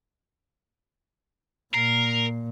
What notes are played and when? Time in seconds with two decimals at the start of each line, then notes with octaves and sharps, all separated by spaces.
1.74 A#2 A#4 C7